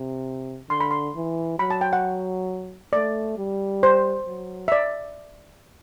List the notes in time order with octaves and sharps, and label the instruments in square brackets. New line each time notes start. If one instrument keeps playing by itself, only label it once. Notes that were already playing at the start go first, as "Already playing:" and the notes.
Already playing: [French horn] C3
[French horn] D3 [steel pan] C6
[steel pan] B5
C6
[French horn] E3
[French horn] F#3 [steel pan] B5
[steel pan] A5
G5
F#5
[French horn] A3 [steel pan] D5
[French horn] G3
[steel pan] C5
[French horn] F#3
[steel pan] E5
D5